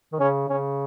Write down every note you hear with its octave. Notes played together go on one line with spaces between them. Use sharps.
D#3
C#3 C#4
C#3 C#4